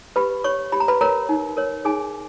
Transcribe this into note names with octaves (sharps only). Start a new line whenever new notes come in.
G4 B4 B5
C#5 C#6
G4 B5
A#5
B4 B5
A#4 C#5 A#5
D#4
A#4 C#5
D#4 G#4 G#5